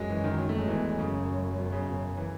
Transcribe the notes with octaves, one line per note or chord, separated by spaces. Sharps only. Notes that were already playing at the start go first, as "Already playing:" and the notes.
Already playing: F#2 F#3 G#3
E3
D#3
F#3
A3
G#3
E2 E3
F#2 C#3
B2
C#3
F#2
E3